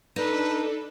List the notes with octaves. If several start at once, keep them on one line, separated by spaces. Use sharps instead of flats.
D4 D#4 A4 B4